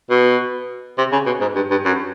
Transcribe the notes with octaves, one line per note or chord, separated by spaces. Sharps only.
B2
C3
C#3
B2
G#2
G2
G2
F#2